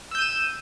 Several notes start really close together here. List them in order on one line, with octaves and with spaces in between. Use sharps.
E6 G6 D#7 E7